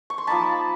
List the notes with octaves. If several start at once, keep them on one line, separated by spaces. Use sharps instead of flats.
C#6
C6
F3 A#3 D#4 A5 B5